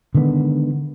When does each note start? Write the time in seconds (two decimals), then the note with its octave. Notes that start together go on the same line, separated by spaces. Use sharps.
0.15 D3 D#3 G#3 B3